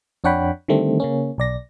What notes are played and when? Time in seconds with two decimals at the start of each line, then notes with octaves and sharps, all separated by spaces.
0.24 F2 D4 C#5 F#5 G5 B5
0.68 D3 D#3 G3 A3 C4
1.00 C#3 A#3 C#4
1.38 B1 D5 A#6